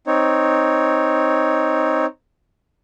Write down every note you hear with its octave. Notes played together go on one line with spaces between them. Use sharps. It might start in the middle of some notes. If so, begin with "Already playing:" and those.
C4 D#4 C#5